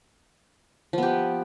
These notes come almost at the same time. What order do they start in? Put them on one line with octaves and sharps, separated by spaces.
F3 B3 G4